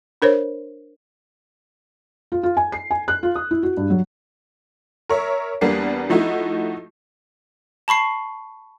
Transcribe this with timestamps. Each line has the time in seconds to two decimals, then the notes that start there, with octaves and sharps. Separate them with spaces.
0.22 D4 A#4 C5 C#5
2.32 F4
2.43 F4
2.57 G#5
2.72 C7
2.91 G#5
3.08 F#6
3.23 F4
3.35 D#6
3.51 E4
3.63 F#4
3.77 G2
3.90 F#3
5.09 A#4 C#5 E5
5.61 E2 G3 A#3 B3 D4 C7
6.09 F3 A3 D#4 E4 F#4
7.88 A5 B5 C#6 C7